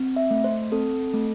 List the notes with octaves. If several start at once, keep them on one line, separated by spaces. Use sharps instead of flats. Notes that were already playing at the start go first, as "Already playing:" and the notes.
Already playing: C4
E5
A3
C5
C4 A4
A3